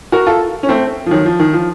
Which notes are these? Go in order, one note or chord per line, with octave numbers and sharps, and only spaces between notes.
F#4 A#4
F4 A4
C#4
A3 C4
F3
D#3 F#3
F3
D#3
F3